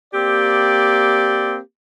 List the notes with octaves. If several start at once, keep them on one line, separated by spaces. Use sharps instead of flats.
A#3 C4 G4 D5